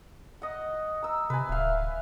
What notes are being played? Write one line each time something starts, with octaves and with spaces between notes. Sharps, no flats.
D#5 F#5
A#5 E6
C3 B4 G#5
D1 E5 F5